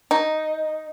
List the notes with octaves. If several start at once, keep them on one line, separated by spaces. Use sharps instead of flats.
D#4